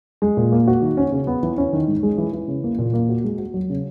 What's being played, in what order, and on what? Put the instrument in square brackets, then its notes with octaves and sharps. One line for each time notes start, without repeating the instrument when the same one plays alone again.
[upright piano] G#3
A#2
A#3
F#4
D#3
C#4
C#3
B3
E3
C#4
D#3
G#2
G#3
E3
E3
C#3
A#3
A#2
A#3
F#4
G#3
F#4
F#3
C#3